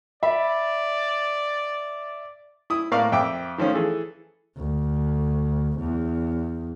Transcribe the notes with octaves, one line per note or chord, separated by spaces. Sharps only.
D5 E5 B5 C7
E4 D#6
A2 A#3 D5 F5 C#6 F6
F2 E5 G5 D6
D#3 F3 A3 C#4
E3 G#4 A4
D2
E2